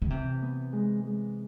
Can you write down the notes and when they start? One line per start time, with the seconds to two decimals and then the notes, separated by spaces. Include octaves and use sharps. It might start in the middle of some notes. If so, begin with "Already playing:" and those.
0.02 C#3
0.10 C3 E3
0.42 B3
0.73 G#3
1.04 G#3